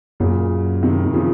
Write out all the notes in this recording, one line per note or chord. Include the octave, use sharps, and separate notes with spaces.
F#2 A#2 C#3
C3 D#3
D#3
C#3 F3